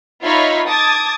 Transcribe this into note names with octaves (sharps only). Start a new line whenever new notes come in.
D#4 F4 C#5 E5 B5 F6
A5 D6 D#6 G#6 A6